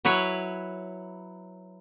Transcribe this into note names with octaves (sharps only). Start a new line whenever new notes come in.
F#3 E4 B4 C#5